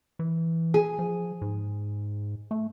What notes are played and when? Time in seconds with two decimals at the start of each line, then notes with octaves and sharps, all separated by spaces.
0.19 E3
0.74 G#4
0.99 F3
1.41 G#2
2.51 A3